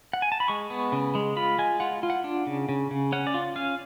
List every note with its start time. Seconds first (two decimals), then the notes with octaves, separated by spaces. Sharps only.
0.13 F#5
0.22 G#5
0.32 A5
0.40 B5
0.48 G#3 C#6
0.70 B3
0.92 C#3
1.15 G#3
1.37 F4 B5
1.58 G#3 G#5
1.80 F4 F#5
2.03 F4
2.10 F#5
2.24 D4
2.47 C#3
2.69 C#3
2.91 C#3
3.12 C#4 F#5
3.27 D5
3.34 F4
3.56 C#4 F5